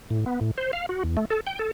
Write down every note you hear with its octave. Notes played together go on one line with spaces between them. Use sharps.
A2
B3
A2
C5
F5
F#4
E2
A3
A4
G5
A4